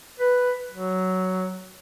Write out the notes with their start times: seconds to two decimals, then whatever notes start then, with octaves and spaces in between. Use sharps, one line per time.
0.19 B4
0.72 F#3